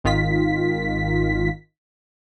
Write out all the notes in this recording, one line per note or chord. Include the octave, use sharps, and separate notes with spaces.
G#1 D#3 F4 B6